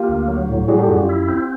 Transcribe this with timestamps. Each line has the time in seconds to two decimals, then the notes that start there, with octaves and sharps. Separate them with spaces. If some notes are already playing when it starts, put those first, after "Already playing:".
Already playing: A#3 F4 G4
0.09 D2
0.28 F#3
0.48 A2
0.68 G3 F#4 G#4
0.78 G4 A4
0.88 F#2 F#4 G#4
0.98 F4 G4
1.09 E4
1.28 C4